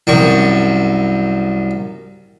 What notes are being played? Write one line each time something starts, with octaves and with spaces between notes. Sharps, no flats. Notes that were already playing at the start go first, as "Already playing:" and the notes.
C2 F#2 C#6